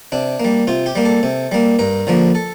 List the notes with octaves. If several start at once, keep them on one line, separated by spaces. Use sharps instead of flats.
C3 D4
G3 A#3
C3 F4
G4
G3 A#3
A4
C3
G3 A#3
G2 A#4
D3 F3 A#3
A4